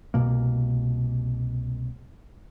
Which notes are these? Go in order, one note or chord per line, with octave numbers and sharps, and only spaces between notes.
C2 B2 A#3